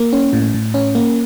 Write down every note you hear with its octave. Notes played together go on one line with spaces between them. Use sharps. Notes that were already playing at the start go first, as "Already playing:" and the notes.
Already playing: A#3
C#4
A2
A2
C#4
A#3